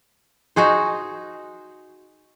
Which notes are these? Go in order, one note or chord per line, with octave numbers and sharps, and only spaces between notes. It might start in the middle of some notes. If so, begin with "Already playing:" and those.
D#4 F#4 G#4 C5